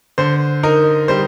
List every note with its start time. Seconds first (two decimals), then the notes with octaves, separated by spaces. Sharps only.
0.18 D3 C5
0.63 D#4 A#4
1.08 G3 C5